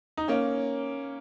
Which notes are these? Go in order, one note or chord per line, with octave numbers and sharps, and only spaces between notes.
D#4
A#3 C#4